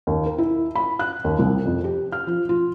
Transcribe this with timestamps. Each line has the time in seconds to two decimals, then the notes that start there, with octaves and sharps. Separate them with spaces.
0.07 D#2
0.26 A#4
0.38 E4
0.76 B5
0.99 F#6
1.24 D#2
1.39 C2
1.66 F2
1.84 G4
2.12 F6
2.27 F3
2.49 F4